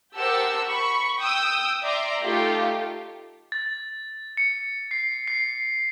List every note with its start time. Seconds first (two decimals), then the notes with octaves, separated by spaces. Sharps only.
0.15 G4 A#4 C5 F#5 A5 E6
0.68 B5 C#6
1.20 G5 D#6 E6
1.82 D5 E5 A#5 C6 D6
2.23 A3 D#4 F4 G4 A4
3.52 A6
4.37 C#7
4.91 C7
5.28 C7